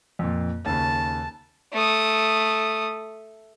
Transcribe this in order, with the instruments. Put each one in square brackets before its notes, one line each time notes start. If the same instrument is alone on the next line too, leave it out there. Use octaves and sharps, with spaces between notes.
[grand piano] F2 A#2
[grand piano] D#2 C#3 [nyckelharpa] A5
[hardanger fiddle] A3 D#6